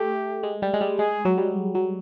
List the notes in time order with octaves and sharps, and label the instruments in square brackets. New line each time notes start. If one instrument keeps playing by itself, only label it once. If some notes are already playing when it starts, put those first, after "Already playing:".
Already playing: [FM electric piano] A3 [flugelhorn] G4
[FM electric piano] G#3
G3
G#3
G3
[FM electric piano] G#3 [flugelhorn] G#4
[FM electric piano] F#3
G3
F#3